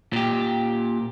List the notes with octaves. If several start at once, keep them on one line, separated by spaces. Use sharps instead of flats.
A#2 G4